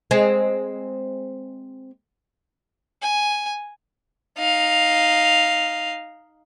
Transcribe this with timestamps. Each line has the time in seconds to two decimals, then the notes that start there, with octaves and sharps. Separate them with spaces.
0.11 G#3 C4
3.02 G#5
4.38 D#4 F5